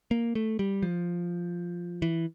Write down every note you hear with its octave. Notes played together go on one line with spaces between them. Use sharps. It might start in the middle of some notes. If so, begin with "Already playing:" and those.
A#3
A3
G3
F3
E3